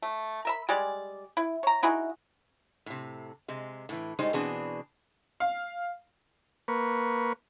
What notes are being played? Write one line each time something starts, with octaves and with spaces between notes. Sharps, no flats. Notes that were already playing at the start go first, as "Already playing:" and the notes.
A3
A#4 E5 B5
G3 G#3 G#4 D5
E4
C#5 A#5
D#4 E4 F#4 G#4
A2 C3
C3 G#3
A2 E3
A2 G3 G#3 D#4 C5
B2 E3 B3 C4 D4 G#4
F5
A#3 B4 C#6